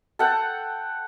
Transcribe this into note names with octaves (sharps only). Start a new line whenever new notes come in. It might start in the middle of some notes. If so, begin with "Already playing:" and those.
A4 F#5 G5